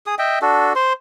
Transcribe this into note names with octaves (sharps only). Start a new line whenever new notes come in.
G#4 D#6
D#5 E5 G5
D4 F#4 A4
C5 C6